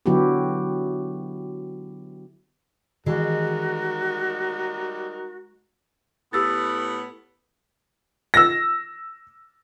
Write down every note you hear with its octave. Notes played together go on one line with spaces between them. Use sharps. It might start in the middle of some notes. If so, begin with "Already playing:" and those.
D3 F#3 B3 E4 F#4 G4
D#3 E3 G3 G#3 D#4 F#4 A#4
A2 B3 G4 E6 A6
E6 A#6